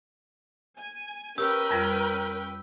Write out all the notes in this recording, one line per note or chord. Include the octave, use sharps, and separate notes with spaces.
G#5
C#4 G4 A#4 B4 G5 E6
F2 G3 F4